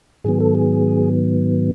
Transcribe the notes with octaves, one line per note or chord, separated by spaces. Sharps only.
G#2 D#3 F#3 B3 G#4
A4
G#4